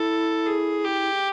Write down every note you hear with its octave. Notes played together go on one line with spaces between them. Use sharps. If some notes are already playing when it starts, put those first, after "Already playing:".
Already playing: E4 A4
G#4
G4